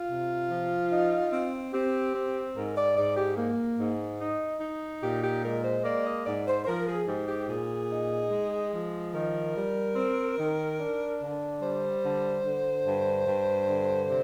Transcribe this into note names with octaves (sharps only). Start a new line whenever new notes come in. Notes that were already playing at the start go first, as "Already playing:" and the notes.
Already playing: F4
C3
F3
D#4
C4
C4 G4
C4
G#2 A#4
D5
G#2 D5
G4
A#3
G#2
D#4
D#4
A#2 G4
G4
G#3 A#4
C5
A#3 D5
D#5
G#2 D5
C5
C5
F3 A#4
G#4
G#2 G4
G4
A#2 G#4
D#4
G#3
F3
D#3 A#4
G3
C4
D#3
D4
D3
G3 C5
D3
D3
G2
G2
D3
C3